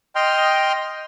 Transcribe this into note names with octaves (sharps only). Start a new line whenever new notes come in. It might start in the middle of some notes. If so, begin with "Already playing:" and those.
D#5 G5 C6 F6